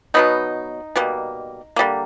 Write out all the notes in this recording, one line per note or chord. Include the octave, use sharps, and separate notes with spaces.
B2 F#3 B3 D#4
B2 G3 A#3
D3 G3 A#3